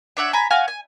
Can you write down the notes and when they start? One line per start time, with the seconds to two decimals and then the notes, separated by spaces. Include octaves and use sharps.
0.17 D4 C#5 E5 F#5
0.33 G#5 A#5 B5
0.51 F#4 F5 G#5
0.68 G#5